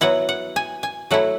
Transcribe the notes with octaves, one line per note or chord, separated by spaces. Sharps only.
F#3 B3 E4 F#5
F#5
G#5
G#5
F#3 A3 E4 F#5